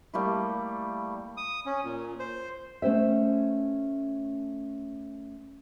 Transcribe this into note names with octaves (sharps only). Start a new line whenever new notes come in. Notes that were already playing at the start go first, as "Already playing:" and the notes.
G3 A3 A#3 E4
D#6
C#4
A#2
C5
A3 C#4 C5 E5